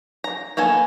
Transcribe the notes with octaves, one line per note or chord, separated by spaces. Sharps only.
A#5
A#3 B3 A4 G#5